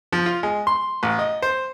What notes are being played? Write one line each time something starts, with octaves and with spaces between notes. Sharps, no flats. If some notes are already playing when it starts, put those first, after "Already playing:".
F3
F4
G#3
C6
A1
D#5
C5